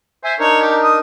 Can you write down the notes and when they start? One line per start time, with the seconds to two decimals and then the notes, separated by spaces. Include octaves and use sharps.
0.24 C5 E5 G#5
0.39 D4 D#4 A#4 C#5
0.61 G4
0.83 D#6